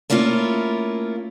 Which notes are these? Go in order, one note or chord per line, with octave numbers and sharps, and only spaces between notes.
A3 A#3 C#4 E4 F4